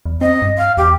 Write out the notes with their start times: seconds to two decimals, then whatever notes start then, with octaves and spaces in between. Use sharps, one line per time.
0.06 E2
0.21 C4 D#5
0.42 G2
0.58 F5
0.77 E2 G4